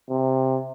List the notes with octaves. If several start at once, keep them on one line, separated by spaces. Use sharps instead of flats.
C3